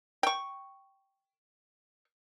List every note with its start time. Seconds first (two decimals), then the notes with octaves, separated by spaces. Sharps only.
0.23 G5 C#6